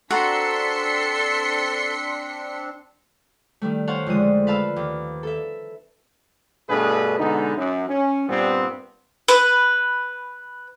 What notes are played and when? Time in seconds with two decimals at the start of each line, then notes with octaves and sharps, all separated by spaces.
0.11 C4 D4 F#4 A4 A#5 C6 B6 C#7
3.62 D#3 G3 A3
3.87 C5 C#5 F5 F#5 A5
4.06 F2 D3 G#3 D#6
4.47 B4 F5 A5 E6
4.76 D#2
5.23 A4 E5
6.69 G2 B2 A3 D4 G#4 B4
7.19 B2 D3 G#3 B3 D#4
7.57 F#2
7.89 C#4
8.29 G2 A#2 G3 B3 C4
9.28 B4